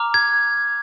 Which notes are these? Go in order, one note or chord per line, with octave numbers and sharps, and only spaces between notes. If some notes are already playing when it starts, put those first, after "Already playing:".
Already playing: A#5 D6 F6
G#6